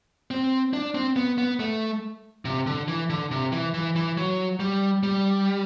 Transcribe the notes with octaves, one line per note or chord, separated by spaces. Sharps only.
C4
D4
C4
B3
B3
A3
C3
D3
E3
D3
C3
E3
E3
E3
F#3
G3
G3